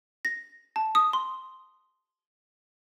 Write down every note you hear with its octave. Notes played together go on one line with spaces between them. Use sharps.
A#6
A5
D#6
C6